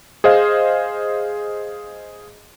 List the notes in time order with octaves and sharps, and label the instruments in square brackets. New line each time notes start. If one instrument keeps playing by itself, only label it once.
[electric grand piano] G#4 C5 D#5 F5